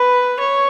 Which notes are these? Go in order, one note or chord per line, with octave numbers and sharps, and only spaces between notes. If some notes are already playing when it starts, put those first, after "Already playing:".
Already playing: B4
C#5